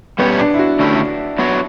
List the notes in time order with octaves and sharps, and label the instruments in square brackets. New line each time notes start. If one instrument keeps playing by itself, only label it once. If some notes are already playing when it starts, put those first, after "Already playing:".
[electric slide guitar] B2 G3 C#4 G4 C#5 [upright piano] B3
[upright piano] D4
E4
F#4
[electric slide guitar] D3 A3 C#4 E4 G4
F#3 B3 D4 F#4 C#5